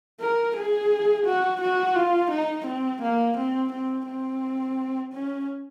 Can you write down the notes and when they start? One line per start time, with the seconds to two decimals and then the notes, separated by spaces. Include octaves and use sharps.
0.20 A#4
0.56 G#4
1.26 F#4
1.61 F#4
1.96 F4
2.31 D#4
2.66 C4
3.02 A#3
3.37 C4
3.72 C4
4.07 C4
5.13 C#4